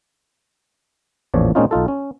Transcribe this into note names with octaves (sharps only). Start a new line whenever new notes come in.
A1 E2 A#2 F3 C#5 D5
A#2 G#3 C4 C#4 D#4 F4
B1 D#4 F4 A4
C#4